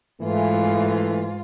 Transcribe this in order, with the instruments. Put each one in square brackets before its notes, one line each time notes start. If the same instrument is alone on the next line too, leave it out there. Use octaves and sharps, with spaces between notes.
[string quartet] G#2 F4 [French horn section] E3 A3